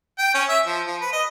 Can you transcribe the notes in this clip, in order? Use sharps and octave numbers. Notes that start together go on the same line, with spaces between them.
G5
C#4
E5
F3
F3
B4
D#5